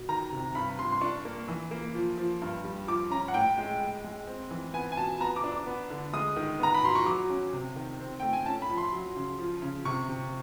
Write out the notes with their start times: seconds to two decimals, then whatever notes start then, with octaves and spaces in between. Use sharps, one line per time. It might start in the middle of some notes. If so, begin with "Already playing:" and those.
Already playing: B2
0.09 D#3 A#5
0.32 C3
0.55 G2 B5
0.78 G2 C6
0.92 C6
1.01 D4 C#6
1.25 A#3
1.48 E3
1.71 A#3
1.95 F3
2.17 F3
2.42 G2
2.64 G3
2.87 F3 D6
3.10 C#4 A#5
3.28 F#5
3.34 A2 G5
3.58 G#3
3.81 G#3
4.04 G#3
4.27 C4
4.51 E3
4.74 B3 G#5
4.92 G#5
4.97 B2 A5
5.20 B3 A#5
5.36 D6
5.44 D4
5.52 D6
5.66 B3
5.90 D3
6.13 G#3 D#6
6.36 D#3
6.59 B3 A#5
6.74 B5
6.83 B2 C6
6.95 C#6
7.06 F#3 D6
7.30 C#4
7.53 C3
7.76 D#3
7.99 C4
8.20 A3 G5
8.33 G#5
8.46 C#4 A5
8.62 B5
8.70 F3
8.78 C6
8.92 F#3
9.16 C#3
9.39 F3
9.62 C#3
9.85 C3 C#6
10.09 C3